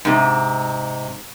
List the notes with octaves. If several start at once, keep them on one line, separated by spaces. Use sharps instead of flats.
G#2 C3